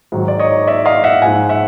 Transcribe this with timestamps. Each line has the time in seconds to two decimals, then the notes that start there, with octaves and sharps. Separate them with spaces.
0.12 G#2 D#3 F#3
0.28 D5
0.39 C#5 D#5
0.67 D5 E5
0.85 D#5 F5
1.04 E5 F#5
1.22 G#2 F3 F#5 G#5
1.49 E5 F#5